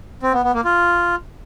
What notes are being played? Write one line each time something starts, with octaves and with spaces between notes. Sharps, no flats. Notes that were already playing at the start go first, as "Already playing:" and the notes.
C4
B3
B3
A#3
F4